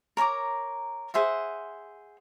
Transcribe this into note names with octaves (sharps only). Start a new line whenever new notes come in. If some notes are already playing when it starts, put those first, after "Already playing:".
A#4 C#5 A#5 D6
G#4 C5 E5 F#5